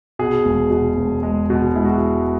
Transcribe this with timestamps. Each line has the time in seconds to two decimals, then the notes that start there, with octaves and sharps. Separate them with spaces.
0.19 B2 G#4
0.45 E1
0.71 B2
0.97 E1
1.23 G#3
1.50 B2
1.76 G#3 E4
1.85 F#4